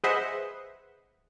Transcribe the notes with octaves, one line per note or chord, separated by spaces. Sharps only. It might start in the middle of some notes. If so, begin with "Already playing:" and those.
G#4 B4 C5 D#5 E5 F#5